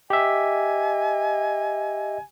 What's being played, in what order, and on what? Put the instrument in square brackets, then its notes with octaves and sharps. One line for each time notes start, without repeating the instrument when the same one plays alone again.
[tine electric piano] G4 E5 [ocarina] D#5 [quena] G#5